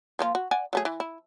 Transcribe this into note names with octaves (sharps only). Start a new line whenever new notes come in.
F3 A#3 F4
F#4
D5 F#5 G#5
F#3 A3 G#4
E3
E4